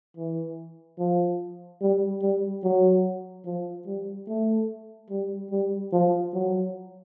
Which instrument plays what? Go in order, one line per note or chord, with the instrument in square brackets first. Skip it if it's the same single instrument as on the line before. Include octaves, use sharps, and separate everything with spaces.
[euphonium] E3
F3
G3
G3
F#3
F3
G3
A3
G3
G3
F3
F#3